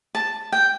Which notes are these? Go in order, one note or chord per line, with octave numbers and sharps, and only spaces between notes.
A5
G5